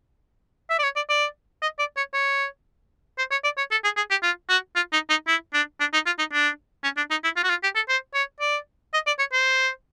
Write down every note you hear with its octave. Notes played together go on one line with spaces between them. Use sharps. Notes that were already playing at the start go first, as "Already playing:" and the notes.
E5
D5
C#5
D5
D5
D#5
D5
C#5
C#5
C5
C#5
D5
C#5
A4
G#4
G#4
G4
F4
F#4
F4
D#4
D#4
E4
D4
D4
D#4
F4
D#4
D4
C#4
D4
D#4
E4
F4
F#4
F4
G4
A4
C5
C#5
D5
D#5
D5
C#5
C5